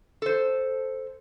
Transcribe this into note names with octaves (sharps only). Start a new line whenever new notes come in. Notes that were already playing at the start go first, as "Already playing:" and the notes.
A4 C5